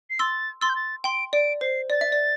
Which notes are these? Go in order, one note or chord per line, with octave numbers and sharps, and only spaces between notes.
C7
C6 E6 A6
C6 E6 A6
G6
A6
G5 C6 D7
D5 D7
C5 C7
D5 A6
E5
D5